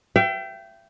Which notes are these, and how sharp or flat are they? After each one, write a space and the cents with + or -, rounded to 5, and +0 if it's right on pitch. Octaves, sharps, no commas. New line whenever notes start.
E5 +40 G5 -15